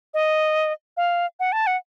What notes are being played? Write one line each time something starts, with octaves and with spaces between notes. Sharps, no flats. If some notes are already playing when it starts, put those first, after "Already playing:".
D#5
F5
F#5
A5
F#5